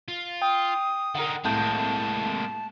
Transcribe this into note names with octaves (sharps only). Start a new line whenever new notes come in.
F4
G5 D#6
D3 D#4 A#4 F#5
C2 A2 G#3 A#3 A5 G6